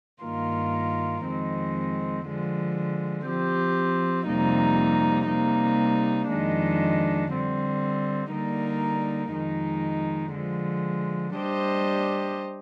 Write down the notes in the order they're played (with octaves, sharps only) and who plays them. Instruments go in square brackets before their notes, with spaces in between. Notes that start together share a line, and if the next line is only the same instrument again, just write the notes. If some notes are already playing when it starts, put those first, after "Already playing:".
[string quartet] G2 D#3 A#3 F4 A#4
F2 D#3 G#3 C4
D3 F3 G#3
F3 C4 G4
F2 C3 G3 A#3 D#4
C3 G3 A#3 D#4
F2 D#3 G#3 D4
D3 G3 C4
D3 G3 A#3 D#4 A#4
F2 D#3 G#3 D#4
D3 F3 G#3
G3 D4 G4 C5 D#5